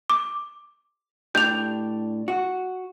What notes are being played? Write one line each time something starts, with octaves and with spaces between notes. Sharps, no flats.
D6
A2 D4 G4 G6 F7
F#4